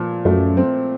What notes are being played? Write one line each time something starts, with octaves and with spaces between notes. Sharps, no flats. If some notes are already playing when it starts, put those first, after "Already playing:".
Already playing: A#2 F3
F#2 A3
C4